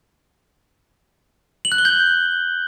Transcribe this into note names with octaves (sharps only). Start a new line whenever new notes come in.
F#7
F#6
G7
G6